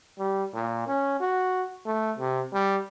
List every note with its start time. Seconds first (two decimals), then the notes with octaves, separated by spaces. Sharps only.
0.18 G3
0.53 A#2
0.87 C#4
1.20 F#4
1.86 A3
2.19 C3
2.53 G3